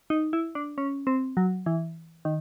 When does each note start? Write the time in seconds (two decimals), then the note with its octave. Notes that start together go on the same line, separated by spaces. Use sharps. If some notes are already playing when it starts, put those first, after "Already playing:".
0.10 D#4
0.33 E4
0.55 D4
0.78 C#4
1.07 C4
1.37 F#3
1.66 E3
2.25 D#3